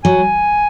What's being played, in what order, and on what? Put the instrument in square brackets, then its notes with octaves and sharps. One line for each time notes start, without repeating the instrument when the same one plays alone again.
[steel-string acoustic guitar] F#3 [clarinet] G#5